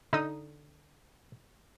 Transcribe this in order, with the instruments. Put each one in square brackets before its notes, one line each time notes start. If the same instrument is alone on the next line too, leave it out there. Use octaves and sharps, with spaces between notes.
[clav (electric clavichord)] D3 [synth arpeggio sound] D#4 D#6